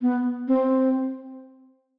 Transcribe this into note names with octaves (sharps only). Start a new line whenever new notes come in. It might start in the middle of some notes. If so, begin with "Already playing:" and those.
B3
C4